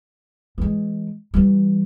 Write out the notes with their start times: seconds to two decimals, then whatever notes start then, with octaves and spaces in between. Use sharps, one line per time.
0.58 E3 G#3
1.34 E3 G3